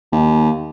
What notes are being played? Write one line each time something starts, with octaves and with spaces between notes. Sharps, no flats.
D#2